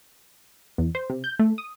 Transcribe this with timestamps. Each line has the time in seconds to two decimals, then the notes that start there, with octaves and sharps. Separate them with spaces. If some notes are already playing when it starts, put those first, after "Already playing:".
0.78 E2
0.95 C5
1.10 C3
1.24 G6
1.39 A3
1.58 D#6